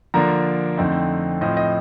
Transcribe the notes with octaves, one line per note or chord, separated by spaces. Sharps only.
D3 F3 A#3 D4 A#5
F2 D3 A3 C4 D#4
A2 F3 C4 D#5
D#5